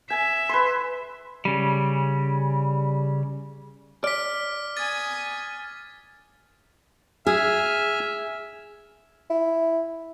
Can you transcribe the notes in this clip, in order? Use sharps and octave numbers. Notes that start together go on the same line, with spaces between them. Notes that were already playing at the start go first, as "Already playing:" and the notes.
E5 G#5
B4 C6
C#3 G3
D5 F6 B6
G#5 D#6 A6
G#4 E5 G#5 F6
E4